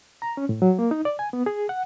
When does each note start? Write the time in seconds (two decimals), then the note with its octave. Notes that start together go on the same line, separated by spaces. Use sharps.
0.22 A#5
0.37 C#4
0.49 A2
0.62 F#3
0.79 A#3
0.91 D#4
1.05 D5
1.19 G#5
1.33 B3
1.46 G#4
1.69 F#5